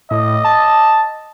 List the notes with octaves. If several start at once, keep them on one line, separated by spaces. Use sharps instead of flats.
A2 D#5
A5